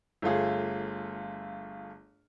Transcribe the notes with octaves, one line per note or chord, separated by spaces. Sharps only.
G1 A3 F4 G#4